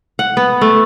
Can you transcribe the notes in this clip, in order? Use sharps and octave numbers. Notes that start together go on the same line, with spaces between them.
F#5
B3
A3